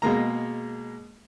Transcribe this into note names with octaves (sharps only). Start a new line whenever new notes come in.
B2 G#3 A#3 A#5